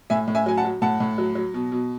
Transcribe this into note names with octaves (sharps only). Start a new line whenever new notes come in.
A2 E5 G#5
A2
E5 G#5
F#3 G#5
F#5 A5
F#3
A2 F#5 A5
A2
F#3
F#3
B2
B2